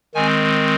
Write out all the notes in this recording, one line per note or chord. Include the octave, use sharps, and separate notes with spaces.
D#3 G#3 C4 G#5